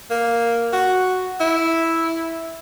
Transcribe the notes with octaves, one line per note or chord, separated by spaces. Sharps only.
A#3
F#4
E4